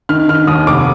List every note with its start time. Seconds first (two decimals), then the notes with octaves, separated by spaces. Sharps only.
0.09 D#3 F6
0.28 D#3 F6
0.47 D#2 D#6
0.67 F1 D6